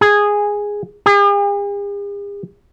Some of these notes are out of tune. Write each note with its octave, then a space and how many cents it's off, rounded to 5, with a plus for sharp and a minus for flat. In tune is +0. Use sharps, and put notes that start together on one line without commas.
G#4 -5
G#4 -45